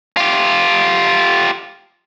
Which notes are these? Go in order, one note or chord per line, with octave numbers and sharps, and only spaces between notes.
F4 G4